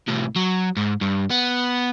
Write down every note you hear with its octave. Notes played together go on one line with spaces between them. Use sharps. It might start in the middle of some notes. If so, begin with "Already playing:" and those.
A2 C3
F#3
G#2
G2
B3